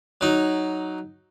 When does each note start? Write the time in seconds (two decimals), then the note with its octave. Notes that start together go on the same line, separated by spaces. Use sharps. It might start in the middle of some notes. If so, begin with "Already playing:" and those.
0.21 F#3 D#4